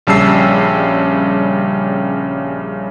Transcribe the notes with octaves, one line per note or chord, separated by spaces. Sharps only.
A#1 C#3 G3 A5 E6 C7